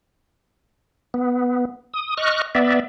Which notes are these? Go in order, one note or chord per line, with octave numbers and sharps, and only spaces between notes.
B3
D#6
D#5 C#6 F6 F#6
B3 D5 E5